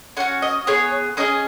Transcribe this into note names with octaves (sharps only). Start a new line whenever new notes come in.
C#4 F#4 F#5
D#5
B3 G#4 C#5
C#4 G#4 D#5